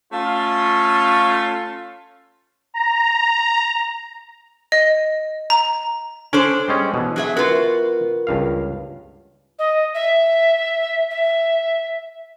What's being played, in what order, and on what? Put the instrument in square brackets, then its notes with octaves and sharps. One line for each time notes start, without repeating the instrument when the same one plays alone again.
[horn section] A3 C#4 F4
[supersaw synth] A#5
[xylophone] D#5
A#5
[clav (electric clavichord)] C#4 [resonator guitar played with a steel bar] D4 A4 C5
[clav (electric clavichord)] G3 G#3 C#4
B2 E3
[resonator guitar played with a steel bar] F#3 G#4 E5
[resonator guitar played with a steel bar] F4 F#4 [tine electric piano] A#4 B4
[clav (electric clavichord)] C#2 G2 F5
[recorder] D#5
E5
E5